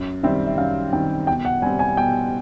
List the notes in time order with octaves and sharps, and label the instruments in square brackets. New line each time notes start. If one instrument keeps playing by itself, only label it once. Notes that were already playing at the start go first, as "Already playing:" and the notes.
Already playing: [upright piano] F#2
[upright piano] D#3 G3 C4 [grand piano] E5
[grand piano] E5
[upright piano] F#2 [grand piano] F5
[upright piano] D#3 G3 C4 [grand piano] G5
[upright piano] B2 [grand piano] G5
[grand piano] F#5
[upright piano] G3 C4 [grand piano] G#5
[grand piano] G#5
[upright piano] B2 [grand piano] G5